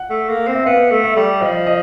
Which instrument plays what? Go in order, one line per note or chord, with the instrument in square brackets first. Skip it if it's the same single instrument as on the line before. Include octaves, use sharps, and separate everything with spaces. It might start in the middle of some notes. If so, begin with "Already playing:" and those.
Already playing: [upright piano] F#5
[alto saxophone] A3
A#3
C4
[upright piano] E5
[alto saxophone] B3 [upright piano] F5
[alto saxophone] A3
[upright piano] E5
[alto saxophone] G3
[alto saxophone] F3 [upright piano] D#5
[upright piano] D#5